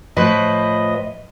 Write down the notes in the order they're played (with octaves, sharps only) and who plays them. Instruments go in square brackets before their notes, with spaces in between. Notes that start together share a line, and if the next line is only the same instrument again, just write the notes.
[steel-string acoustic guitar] A2 F3 B4 [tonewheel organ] D#5